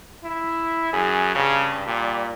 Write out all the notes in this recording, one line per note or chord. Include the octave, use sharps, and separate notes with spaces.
E4
F#2 G#4
G2 C#3
A#2 G3